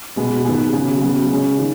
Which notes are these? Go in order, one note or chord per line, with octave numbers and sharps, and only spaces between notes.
B2 G#3 B3
D#3 B3 G#4
C#3 F#3 B3 G#4
C#3 F#3 B3
C#3 G#3 C#4 G#4
D#3